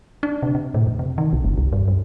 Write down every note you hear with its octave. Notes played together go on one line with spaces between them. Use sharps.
D4
C3
C3
A2
F2
C3
D#3
B1
F#1
C2
G2
F#2